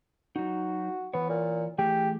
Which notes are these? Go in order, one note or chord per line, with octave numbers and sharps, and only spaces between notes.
F#3 D#4 F#4
E3 B3 C#5
A#2
E3 A3 G4 G#4